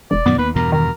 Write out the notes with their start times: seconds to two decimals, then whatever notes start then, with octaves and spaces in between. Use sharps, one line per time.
0.11 E1 D5
0.26 F#2 A#2 D#3 B3
0.38 D#2 B4
0.56 E2 G2 B2 A#4
0.72 D#3 A#4